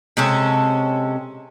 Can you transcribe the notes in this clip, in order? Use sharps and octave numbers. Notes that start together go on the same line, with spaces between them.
C3 G#3 C#4 A4